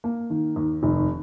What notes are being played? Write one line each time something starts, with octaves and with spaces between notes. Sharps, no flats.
A#3
D#3
D#2
F1